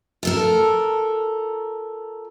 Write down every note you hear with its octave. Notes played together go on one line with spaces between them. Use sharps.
F4 A4 A#4